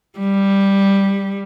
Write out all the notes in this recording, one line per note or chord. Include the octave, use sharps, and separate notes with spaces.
G3